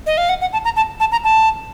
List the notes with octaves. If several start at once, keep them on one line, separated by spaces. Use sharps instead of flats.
D#5
F5
F#5
F#5
A5
A#5
A5
A5
A#5
A5